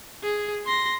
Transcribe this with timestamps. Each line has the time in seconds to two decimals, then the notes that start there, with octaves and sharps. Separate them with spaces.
0.23 G#4
0.66 C6 A#6